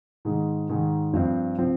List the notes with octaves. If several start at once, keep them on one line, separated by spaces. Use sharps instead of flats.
G#2 D#3 G#3
G#2 D#3 G#3
G2 F3 C4
F3 C4